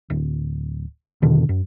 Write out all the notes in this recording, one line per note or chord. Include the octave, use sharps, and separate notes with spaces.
D1
E2 B2 D3 D#3
F#2